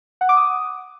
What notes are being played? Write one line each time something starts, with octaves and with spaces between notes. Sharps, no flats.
F#5
D6
D#6